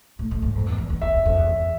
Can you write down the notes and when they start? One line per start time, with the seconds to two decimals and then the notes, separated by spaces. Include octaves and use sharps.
0.19 A2
0.31 A2
0.42 G#2
0.55 F2
0.66 E2
0.78 E2
0.90 E2
1.01 E2 E5
1.13 E2
1.26 F2
1.37 E2
1.49 E2